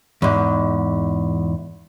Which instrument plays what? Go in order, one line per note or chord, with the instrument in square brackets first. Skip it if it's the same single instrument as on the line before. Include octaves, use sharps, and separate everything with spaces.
[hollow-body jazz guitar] E2 G#2